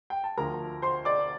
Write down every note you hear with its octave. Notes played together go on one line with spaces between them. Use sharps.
G5
A5
D2 D3 F3 A#4 A#5
C5 C6
D5 D6